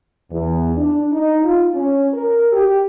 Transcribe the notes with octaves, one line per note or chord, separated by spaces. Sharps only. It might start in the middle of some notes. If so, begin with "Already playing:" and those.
E2
D4
D#4
F4
C#4
A#4
G4